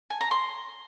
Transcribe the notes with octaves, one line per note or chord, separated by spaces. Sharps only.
G#5
A#5
C6